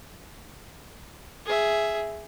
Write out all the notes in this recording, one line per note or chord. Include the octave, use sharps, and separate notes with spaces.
G#4 E5